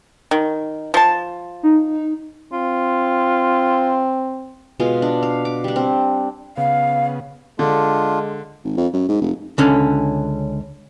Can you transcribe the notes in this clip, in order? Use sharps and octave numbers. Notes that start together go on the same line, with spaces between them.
D#3
F3 A5
D#4
C4 F4
B2 G#3 F4
D4
F5
D6
G3 D4
C4
C#3 B3 F5
D3 G#3 D4 F4
G#1
F2
F#2
G#2
F1
C#2 D3 C#4